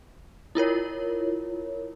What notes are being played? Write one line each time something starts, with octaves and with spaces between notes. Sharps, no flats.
E4 F4 A#4 C#5